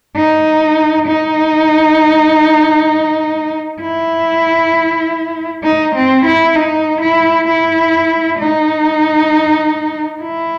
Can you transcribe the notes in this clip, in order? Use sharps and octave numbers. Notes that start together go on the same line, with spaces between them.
D#4
D#4
E4
D#4
C4
E4
D#4
E4
E4
D#4
E4